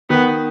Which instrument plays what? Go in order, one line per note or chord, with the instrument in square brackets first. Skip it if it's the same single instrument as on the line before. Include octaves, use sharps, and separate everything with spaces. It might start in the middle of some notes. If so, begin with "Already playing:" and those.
[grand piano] D#3 [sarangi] B3